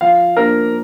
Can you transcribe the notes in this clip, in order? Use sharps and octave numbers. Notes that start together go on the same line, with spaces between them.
F3 F5
A#3 D4 G4 A#4 C5